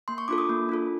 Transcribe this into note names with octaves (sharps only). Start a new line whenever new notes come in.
A#3 C6
C#6
D4 F4 A4 D6
D#6
A#3
D4 F4 A4